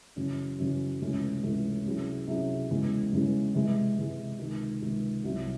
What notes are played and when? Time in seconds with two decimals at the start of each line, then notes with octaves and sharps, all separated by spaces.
0.16 F#2 C#3 E3
0.58 F#2 C#3 E3
1.01 C#2 C3 E3 A3 C#4
1.43 C#2 C3 E3 A3 C#4
1.85 C3 F#3 C#4 E4 G#4
2.27 C3 F#3 C#4 E4 G#4
2.70 E2 C#3 E3 G#3
3.12 E2 C#3 E3 G#3
3.55 C3 E3 G#3
3.97 C3 E3 G#3
4.39 C#2 C3 D#3
4.82 C#2 C3 D#3
5.24 C2 C3 F#3 C4